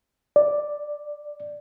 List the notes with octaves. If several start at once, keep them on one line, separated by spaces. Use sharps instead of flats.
D5